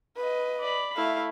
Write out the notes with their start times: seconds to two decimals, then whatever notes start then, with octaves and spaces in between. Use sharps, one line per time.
0.17 B4 D#5
0.59 D5 B5
0.96 A3 E4 F5